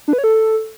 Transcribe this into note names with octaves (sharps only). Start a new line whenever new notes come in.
D4
B4
C#5
A4